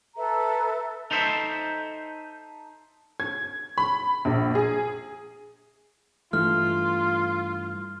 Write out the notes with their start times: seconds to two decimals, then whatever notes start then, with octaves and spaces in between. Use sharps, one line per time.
0.17 A4 B4 E5 A#5
1.11 D#4 A4 C5 E5
3.20 G#6
3.78 B5
4.25 A#1
4.55 G#4
6.33 G2 E3 A3 F4 F6